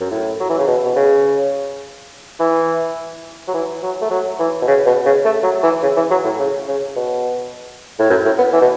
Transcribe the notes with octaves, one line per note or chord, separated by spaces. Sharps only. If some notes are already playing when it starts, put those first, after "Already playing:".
F#2
A2
F#3
E3
C#3
B2
B2
C#3
E3
F#3
E3
F#3
A3
F#3
E3
B2
C#3
B2
C#3
A3
F#3
E3
C#3
E3
F#3
A2
C#3
C#3
B2
A2
F#2
A2
B3
E3
B2